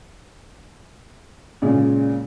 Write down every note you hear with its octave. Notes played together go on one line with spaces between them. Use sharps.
A#2 C#3 G#3